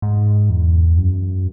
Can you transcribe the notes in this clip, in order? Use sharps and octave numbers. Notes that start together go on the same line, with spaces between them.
G#2
E2
F#2